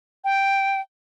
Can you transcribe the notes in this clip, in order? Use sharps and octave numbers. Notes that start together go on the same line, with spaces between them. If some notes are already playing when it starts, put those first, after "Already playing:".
G5